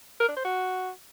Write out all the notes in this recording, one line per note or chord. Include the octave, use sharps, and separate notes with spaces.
A#4
D4
C5
F#4